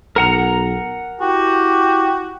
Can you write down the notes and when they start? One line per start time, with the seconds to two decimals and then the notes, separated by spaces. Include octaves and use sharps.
0.16 B1 A#4 F#5 A#5
1.21 E4 F#4 G4